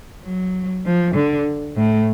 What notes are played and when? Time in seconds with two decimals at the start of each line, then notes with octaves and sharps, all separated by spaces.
0.24 F#3
0.86 F3
1.15 D3
1.76 A2